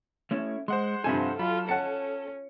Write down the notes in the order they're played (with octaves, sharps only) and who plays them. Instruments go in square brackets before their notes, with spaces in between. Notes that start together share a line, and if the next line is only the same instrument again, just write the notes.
[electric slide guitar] A3 C#4 E4
[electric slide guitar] G#3 [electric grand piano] C5 F#5 C6
[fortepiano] G2 C3 G#5 [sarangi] F3 [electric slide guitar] A4
[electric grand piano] F#3 [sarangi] F4 [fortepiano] B5
[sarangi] C#4 [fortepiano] F#5 A5 [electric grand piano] C#7